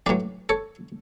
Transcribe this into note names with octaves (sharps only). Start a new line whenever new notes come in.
B1 A2 F#3 B4 D5
A4 C#5